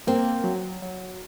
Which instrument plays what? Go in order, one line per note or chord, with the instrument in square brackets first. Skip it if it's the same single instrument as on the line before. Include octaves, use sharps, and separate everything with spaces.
[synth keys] A#3 [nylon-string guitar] C4
[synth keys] F#3
F#3